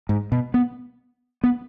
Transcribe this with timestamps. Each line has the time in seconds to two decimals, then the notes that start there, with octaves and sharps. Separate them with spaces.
0.09 G#2
0.32 B2
0.54 B3
1.44 B3